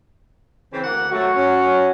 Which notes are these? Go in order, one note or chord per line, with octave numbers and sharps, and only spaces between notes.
C#3 E3 C4
D2 A#3 F#5
F#3 A3 F#4
C#4